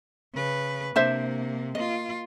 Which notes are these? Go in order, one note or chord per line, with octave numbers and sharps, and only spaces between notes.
C#3 B4
C3 A#3 D4 C5 E5
A#3 F4 D#5